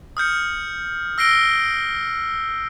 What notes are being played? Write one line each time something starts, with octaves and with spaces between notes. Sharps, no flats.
D#6 F6 G6 C#7
E6 A#6 C7 D7 G7